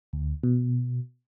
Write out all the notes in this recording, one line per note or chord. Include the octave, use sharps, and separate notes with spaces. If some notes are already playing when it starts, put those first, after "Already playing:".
D2
B2